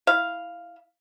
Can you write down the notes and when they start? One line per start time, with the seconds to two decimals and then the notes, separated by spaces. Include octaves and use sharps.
0.07 E4 F5